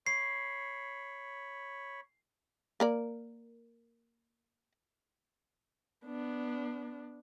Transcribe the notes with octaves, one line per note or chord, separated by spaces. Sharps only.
C#5 B5 C7
A#3 A#4 D5
B3 D4